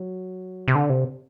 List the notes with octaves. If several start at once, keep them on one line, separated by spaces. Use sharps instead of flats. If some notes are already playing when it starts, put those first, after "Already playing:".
Already playing: F#3
C3
D3
C3